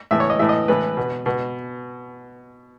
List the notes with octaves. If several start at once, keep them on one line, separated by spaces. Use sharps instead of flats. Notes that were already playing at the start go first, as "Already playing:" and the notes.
A2 E3 E5
C#5
D#5
A2 E3 E5
D#5
A2 E3 B4
B2
B2